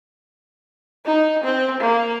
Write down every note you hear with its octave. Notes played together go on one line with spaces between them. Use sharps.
D#4
C4
A#3